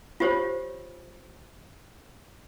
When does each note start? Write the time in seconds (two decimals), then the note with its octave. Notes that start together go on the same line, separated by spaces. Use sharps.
0.20 F4 G4 C5 C#5